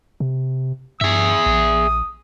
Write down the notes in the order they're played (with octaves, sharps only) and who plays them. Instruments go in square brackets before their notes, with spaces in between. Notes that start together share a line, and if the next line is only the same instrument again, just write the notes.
[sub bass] C3
[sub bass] G2 [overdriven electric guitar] G#4 E5 [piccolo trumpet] D#6
[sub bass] A#1